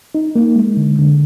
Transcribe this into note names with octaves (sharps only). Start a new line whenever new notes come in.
D#4
A#3
G#3
D3
D3